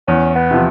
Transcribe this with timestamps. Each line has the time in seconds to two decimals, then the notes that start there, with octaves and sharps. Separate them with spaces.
0.08 E2 C#4
0.35 B3
0.51 C3 F3